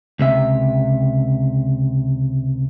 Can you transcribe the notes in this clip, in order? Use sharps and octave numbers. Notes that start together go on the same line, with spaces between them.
C#2 C3 E5